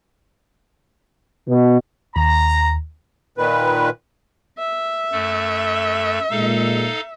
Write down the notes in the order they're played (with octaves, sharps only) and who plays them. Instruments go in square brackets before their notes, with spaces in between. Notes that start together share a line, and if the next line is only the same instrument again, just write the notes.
[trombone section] B2
[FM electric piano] D#2 [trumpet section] A#5
[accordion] A#2 D#3 B4
[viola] E5
[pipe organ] F#2 A3 A4
[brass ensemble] A#2 G#3 [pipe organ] D#4 A4 F5